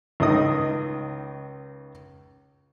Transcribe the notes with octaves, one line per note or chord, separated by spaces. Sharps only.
C#2 D#3 D#5 D#6